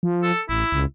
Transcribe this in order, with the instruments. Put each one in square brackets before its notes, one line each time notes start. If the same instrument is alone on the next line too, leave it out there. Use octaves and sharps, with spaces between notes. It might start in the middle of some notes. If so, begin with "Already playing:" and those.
[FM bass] F3
[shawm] A4
[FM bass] A1 [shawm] E4
[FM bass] C#2